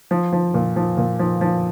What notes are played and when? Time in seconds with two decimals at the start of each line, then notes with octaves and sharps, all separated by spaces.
0.11 F3
0.33 F3
0.54 A#2
0.76 F3
0.97 A#2
1.19 F3
1.41 F3